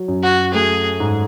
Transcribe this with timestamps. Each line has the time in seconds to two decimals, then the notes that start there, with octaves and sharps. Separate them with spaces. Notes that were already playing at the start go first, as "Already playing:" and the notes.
Already playing: F#3
0.08 F#2
0.23 F#4
0.53 A3 G#4
1.00 G#2